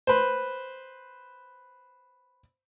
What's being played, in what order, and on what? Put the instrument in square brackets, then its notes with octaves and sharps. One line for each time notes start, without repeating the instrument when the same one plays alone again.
[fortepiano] B4 C5